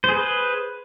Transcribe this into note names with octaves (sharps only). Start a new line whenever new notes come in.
G#4 B4 C5